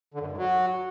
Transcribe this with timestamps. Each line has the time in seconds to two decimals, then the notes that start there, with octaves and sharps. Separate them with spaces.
0.14 D3
0.20 F#2
0.26 G2
0.32 G#2
0.37 F#3